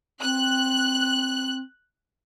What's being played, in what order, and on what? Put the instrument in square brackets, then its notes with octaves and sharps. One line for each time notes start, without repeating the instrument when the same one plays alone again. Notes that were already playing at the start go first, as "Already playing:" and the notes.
[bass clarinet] C4 [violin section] F#6